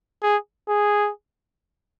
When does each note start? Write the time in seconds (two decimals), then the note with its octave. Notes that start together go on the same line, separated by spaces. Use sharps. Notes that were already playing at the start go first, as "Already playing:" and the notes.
0.23 G#4
0.69 G#4